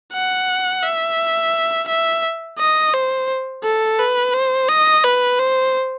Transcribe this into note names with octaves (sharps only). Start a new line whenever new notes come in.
F#5
E5
E5
D#5
C5
A4
B4
C5
D#5
B4
C5